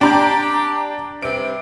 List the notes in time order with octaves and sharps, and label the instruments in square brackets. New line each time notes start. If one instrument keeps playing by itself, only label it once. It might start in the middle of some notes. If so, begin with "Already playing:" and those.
[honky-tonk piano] D4 A#5 G6 [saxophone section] G4
[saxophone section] G2 C3 [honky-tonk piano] D7